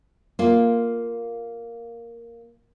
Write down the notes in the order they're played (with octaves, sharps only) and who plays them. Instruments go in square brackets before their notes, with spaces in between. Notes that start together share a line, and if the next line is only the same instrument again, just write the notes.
[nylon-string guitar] A#3 F4